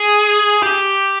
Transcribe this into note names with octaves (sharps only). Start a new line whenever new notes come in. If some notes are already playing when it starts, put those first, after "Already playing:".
Already playing: G#4
G4